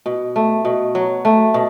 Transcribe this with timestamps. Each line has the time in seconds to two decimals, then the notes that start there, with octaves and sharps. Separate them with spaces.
0.06 B2
0.36 A3
0.65 B2
0.95 F#3
1.25 A3
1.54 B2